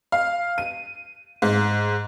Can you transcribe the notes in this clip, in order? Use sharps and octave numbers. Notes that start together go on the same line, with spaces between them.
F5
D#7
G#2